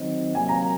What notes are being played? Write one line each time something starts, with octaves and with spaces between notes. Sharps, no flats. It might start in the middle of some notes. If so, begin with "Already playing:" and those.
Already playing: D#3 F#3 C4 D#4
C3 F#3 A#3 G#5
A#5